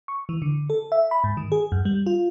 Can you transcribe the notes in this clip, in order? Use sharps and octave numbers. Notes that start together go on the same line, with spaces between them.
C#6
E3
D3
A4
E5
B5
G#2
D#3
G#4
F#2
G3
F4